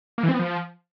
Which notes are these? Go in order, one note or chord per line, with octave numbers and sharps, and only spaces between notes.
A#3
E3
C4
B3
F3